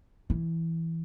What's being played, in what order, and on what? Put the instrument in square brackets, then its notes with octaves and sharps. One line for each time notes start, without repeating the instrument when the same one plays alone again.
[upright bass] E3